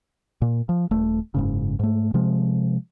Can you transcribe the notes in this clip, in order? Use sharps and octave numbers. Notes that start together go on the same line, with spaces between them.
A#2
F3
D#1 A3
F#1 G#2 C#3
G#2 A3
C3 F3 G#3